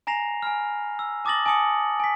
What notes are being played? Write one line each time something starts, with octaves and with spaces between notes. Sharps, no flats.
G#5 A#5 A#6 C7 F7
G#5 B5 F6
E6
A5 D6 D#6 A6 A#6 F#7
G#5 A5 D6 D#6 C#7 F#7
G#5 B6